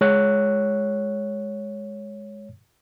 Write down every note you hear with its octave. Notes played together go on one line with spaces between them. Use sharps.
G#3 C#5 F#6